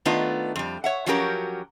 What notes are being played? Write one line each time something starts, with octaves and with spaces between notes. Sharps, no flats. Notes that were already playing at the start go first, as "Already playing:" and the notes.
D#3 A3 B3 D4 D#4 F4
F2 G3
C#5 E5 F#5
F3 F#3 C#4 F#4 G4 A#4